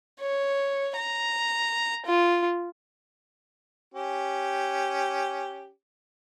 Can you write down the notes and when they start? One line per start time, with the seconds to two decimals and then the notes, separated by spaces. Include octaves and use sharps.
0.20 C#5
0.96 A#5
2.06 F4
3.94 C#4 G4